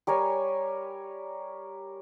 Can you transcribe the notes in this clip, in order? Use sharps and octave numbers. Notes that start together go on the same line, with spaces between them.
G3 A#4 C#5 G#5